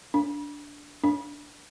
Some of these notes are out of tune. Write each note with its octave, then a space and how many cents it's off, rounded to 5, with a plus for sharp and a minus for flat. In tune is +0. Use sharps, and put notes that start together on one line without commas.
D4 -10
D4 -5